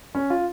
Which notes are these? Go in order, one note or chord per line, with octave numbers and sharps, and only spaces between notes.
C#4
F4